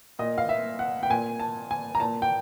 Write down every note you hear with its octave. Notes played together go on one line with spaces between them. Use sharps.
A#2 D#5
F5
E5
F#5
G5
A#2 G#5
A5
G#5
A#5
A#2 A5
G5